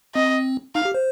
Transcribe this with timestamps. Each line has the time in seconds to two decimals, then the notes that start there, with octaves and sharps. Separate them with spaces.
0.15 C4 D#5
0.75 D#4 F5
0.85 G4
0.94 C5